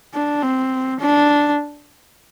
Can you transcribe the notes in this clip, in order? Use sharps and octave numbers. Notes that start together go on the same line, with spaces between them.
D4
C4
D4